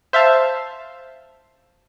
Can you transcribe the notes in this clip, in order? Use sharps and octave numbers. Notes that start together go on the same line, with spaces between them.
C5 E5 F5 A5